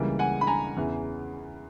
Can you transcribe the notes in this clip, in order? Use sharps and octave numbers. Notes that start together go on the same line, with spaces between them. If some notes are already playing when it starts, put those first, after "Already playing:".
Already playing: C#2 C#3 E3 G3 A#3
F#5 G#5
B5
G#5 A#5
E2 C#3 E3